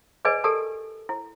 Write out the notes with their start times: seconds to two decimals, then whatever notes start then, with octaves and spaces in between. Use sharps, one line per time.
0.25 G#4 B4 D5 D#5 G#5
0.44 G4 A4 A#4 D5 A5 E6
1.09 E4